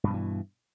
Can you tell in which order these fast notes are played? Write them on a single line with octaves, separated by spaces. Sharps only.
G2 B2 F3 E3